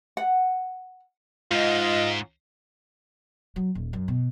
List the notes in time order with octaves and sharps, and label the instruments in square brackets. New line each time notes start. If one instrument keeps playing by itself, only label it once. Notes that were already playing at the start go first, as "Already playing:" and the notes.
[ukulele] F#5
[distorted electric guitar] G#2 [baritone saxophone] F4 [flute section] D#5
[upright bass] F#3
D#1
F#2
B2